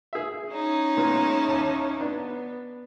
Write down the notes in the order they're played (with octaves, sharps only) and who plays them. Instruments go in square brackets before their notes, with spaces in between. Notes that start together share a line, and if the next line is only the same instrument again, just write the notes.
[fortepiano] G#4 E5
[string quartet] C#4 D#4 E4
[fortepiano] A#2 G#3 B3
D#2 A5
[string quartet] B3 [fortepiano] D4